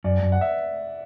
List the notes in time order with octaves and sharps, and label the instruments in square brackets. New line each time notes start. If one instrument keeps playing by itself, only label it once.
[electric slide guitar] F#2 [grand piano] D5
[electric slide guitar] F#2
[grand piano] F#5
E5